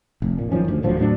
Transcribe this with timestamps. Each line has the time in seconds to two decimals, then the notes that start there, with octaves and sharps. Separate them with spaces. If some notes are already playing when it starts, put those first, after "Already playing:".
0.22 F1
0.38 A#2
0.52 F#2 D#3 F3 C#4
0.68 D2
0.82 D#1 D2 F3 F#3
0.97 E2 A2 F#3 D4